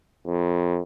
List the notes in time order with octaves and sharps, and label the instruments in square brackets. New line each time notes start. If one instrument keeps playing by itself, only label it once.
[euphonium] F2